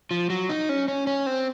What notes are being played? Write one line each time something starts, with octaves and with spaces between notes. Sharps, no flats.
F3
F#3
D#4
C#4
C#4
C#4
C4